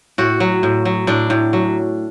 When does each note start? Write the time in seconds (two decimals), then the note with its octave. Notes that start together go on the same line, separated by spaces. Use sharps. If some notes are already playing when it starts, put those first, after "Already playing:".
0.18 A2 F#4
0.40 F#3
0.63 A2
0.85 F#3
1.07 A2 D4
1.30 A2
1.53 F#3